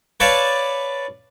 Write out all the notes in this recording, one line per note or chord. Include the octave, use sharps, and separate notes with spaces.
B4 C#5 D5 F5 A5 C#6